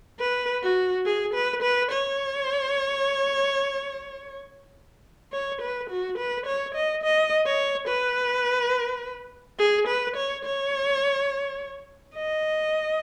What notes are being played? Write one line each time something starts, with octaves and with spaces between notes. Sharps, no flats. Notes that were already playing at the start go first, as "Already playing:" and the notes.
B4
F#4
G#4
B4
B4
C#5
C#5
B4
F#4
B4
C#5
D#5
D#5
C#5
B4
G#4
B4
C#5
C#5
D#5